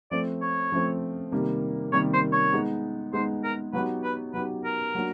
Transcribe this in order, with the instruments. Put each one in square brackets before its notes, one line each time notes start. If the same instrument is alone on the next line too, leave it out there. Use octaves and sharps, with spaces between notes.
[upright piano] F3 A3 C4 [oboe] D5
[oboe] C#5
[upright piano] F3 A3 C4
C3 D#3 G3 A#3
[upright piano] C3 D#3 G3 A#3 [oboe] C#5
[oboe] C5
C#5
[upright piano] G#3 B3 D#4
[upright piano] G#3 B3 D#4 [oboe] C5
[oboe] A#4
[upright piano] F#3 B3 D#4 G4 [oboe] B4
[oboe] B4
[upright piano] F#3 B3 D#4 G4 [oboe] B4
[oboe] A#4
[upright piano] F#3 A#3 D4 F#4